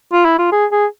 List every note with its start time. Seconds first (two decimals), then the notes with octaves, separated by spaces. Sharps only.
0.13 F4
0.25 E4
0.38 F4
0.52 G#4
0.72 G#4